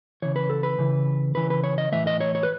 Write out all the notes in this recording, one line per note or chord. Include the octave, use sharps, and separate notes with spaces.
C#3 E3 C#5
B4
A4
B4
C#3 E3
C#3 E3 B4
B4
C#5
D#5
A2 E3 E5
D#5
C#5
C#5
B4